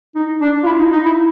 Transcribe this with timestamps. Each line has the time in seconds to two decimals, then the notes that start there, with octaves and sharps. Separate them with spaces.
0.15 D#4
0.41 D4
0.63 F4
0.66 E4
0.79 D#4
0.92 D#4
1.05 E4